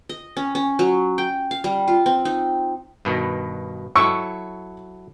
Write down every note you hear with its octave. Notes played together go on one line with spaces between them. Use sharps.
D#5
C#4
C#4
F#3
G5
F5
G3
F4
C4
D#4
G2 B2 D#3
F#3 E4 A4 C#6 E6